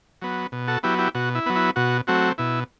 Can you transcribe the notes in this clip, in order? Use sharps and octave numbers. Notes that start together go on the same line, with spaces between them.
F#3 B3
B2
F#4 A4
F#3 B3 E4 G4
E4 G4
B2 F#4
E4
F#3 B3
E4
B2 F#4
F#3 A3 C4 F#4
B2 E4